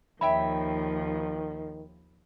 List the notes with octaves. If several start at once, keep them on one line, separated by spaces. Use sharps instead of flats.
D#2 D#3 F3 C#5 E5 G5 B5